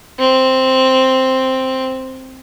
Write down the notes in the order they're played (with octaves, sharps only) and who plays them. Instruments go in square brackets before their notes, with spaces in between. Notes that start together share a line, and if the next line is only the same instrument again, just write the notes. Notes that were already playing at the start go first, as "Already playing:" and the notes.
[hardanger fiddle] C4